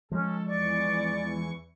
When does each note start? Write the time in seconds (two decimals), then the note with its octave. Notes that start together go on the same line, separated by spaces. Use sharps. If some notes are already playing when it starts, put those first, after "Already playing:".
0.12 F3 G#3 C#4 A4
0.46 E2 E3 D5 C#6